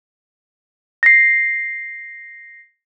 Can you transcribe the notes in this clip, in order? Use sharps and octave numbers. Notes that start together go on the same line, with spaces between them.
A#6 C7